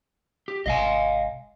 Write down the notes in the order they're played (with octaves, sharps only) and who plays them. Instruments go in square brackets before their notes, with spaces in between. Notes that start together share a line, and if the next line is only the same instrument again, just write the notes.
[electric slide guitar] G4
[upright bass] G#1 C3 [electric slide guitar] D#5 F5 G#5